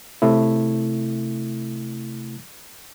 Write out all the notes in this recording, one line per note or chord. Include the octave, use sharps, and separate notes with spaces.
C3 A3 E4